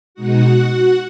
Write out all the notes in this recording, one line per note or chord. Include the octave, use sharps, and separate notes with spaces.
B2 G#3 D#4 F#4 F#5